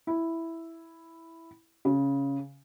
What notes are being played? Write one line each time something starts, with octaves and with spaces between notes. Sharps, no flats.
E4
C#3